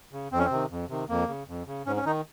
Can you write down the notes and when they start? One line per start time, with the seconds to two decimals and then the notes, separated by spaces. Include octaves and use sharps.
0.13 C#3
0.32 F2 C4
0.39 C#4
0.45 C4
0.50 C3 D#3
0.70 F2
0.89 C3 D#3
1.09 F2 A#3
1.28 C#3
1.48 F2
1.67 C#3
1.86 G#2 C#4
1.97 C#4
2.06 D#3 D#4